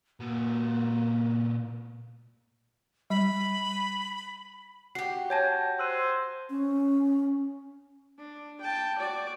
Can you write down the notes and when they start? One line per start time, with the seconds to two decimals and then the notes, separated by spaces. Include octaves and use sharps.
0.20 A#2 A#3 F#4
3.10 G3 B5
4.95 F#4 G4 C7
5.30 C#5 G#5 A5 G6 G#6 A#6
5.79 C5 E6 F#6 D#7
6.50 C#4
8.18 D4
8.61 G5 A5
8.98 F#4 D5